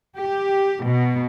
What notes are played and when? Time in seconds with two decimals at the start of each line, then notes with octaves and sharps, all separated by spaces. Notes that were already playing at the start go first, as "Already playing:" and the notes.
0.16 G4
0.82 B2